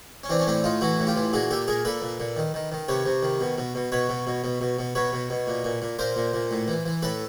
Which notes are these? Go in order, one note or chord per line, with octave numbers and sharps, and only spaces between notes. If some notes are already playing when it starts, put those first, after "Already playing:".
C#4
E3 C4 D4
C#4
A2 C4 D4
A2 D#4 F4
E3 E4 F#4
A2
F4 G4
E3
A#2 F#4 G#4
A#2 G4 A4
A#2 G#4 A#4
A#2 A4 B4
A#2
A#2
D#3
D#3
D#3
C3 B4 C#5
C3
D#3
B2
B2
B2
B2 B4 C#5
B2
B2
B2
B2
B2
B2 B4 C#5
B2
B2
A#2
A#2
A#2
A#2 A#4 C5
A#2
A#2
A2
E3
E3
A2 A4 B4